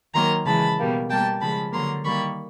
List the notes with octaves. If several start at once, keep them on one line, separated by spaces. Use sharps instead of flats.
D#3 F#3 A#3 A#5 C6
C#3 E3 G#3 A5 B5
B2 G3 A#3
B2 G3 A#3 G5 A5
C#3 F3 G#3 A5 B5
D3 F#3 A#3 A#5 C6
D#3 G3 A#3 B5 C#6